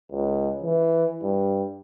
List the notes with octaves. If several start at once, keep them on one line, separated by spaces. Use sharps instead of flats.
C#2
E3
G2